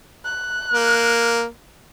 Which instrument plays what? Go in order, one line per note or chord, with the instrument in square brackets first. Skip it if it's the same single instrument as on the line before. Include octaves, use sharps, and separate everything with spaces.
[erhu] F#6
[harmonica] A#3